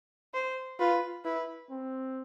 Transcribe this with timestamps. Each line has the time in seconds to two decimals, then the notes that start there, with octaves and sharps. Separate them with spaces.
0.34 C5
0.80 F4 B4
1.25 E4 B4
1.70 C4